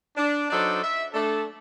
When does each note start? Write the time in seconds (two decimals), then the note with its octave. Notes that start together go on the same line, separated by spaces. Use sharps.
0.16 D4
0.50 F#3 D4 D#4 A4 C5 D5
0.83 E5
1.13 A3 D4 A4